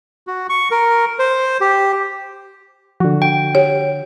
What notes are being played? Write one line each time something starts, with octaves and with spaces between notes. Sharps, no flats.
F#4
C#6
A#4
C5
G4
D3 F3 F#4
G5
G4 C#5